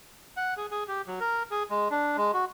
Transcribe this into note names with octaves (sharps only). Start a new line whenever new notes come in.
F#5
G#4
G#4
G4
F#3
A#4
G#4
G#3
D4
G#3
F#4